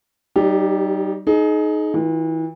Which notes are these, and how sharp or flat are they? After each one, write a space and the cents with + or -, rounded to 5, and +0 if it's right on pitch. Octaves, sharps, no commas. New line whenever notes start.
G3 -40 D#4 -15 G4 +10
D#4 +0 G#4 +35
E3 -35 F4 +0